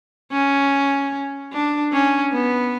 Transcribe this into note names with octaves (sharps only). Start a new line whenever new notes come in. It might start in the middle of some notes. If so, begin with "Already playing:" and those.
C#4
D4
C#4
B3